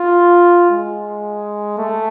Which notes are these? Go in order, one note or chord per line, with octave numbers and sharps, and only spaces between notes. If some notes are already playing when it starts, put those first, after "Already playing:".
Already playing: F4
G#3
A3